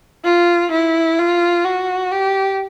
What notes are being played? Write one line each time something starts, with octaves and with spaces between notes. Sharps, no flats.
F4
E4
F4
F#4
G4